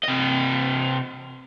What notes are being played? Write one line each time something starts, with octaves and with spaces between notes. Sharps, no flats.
C3 D#5